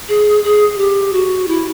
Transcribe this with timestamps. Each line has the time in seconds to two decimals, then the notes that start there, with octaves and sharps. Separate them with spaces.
0.09 G#4
0.44 G#4
0.78 G4
1.13 F#4
1.48 E4